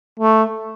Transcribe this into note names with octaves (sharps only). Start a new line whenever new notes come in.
A3